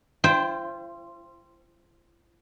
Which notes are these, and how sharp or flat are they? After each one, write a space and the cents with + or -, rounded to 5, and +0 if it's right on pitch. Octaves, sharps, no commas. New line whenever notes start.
F4 -45 C5 +0 G5 +5